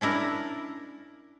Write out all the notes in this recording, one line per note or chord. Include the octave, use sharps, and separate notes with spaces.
C#4 D4 E4 A#4